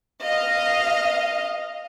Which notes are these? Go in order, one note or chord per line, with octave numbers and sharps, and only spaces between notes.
D#5 F5